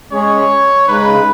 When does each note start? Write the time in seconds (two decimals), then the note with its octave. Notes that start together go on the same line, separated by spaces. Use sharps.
0.12 G#3 C#4 G#4 C#5
0.87 C#3 G#3 D#4 B4